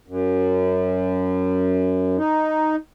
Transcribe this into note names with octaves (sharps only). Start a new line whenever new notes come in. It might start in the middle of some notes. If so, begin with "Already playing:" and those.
F#2
D#4